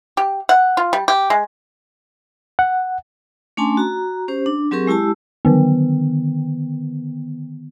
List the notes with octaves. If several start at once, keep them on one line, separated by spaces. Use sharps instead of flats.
G4
F#5
F4
G3
G4
G#3
F#5
A3 C#4 D4 G#5 A5 C6
F#4 A#5
C#4 G4 C5
D4
F#3 C4 G4 G#4 A#4 C#6
G#3 E4 G4 A5 E6
D3 D#3 B3